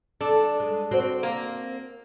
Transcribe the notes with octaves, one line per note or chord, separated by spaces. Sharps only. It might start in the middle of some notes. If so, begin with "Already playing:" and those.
D4 A4
G#3
C4 F#4 C5
A#3